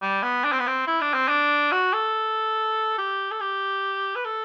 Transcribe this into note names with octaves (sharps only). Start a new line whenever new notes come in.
G3
B3
D4
C4
B3
C4
E4
D4
C4
D4
F#4
A4
G4
A4
G4
B4
A4